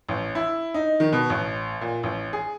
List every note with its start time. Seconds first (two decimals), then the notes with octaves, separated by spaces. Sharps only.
0.09 A1
0.35 E4
0.74 D#4
1.00 D#3
1.13 B2
1.30 A1
1.81 A#2
2.03 A1
2.33 G#4